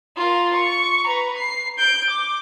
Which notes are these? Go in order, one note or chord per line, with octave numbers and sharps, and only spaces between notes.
F4 A#4
C#6
B4 A#5
C7
G6 D7
D6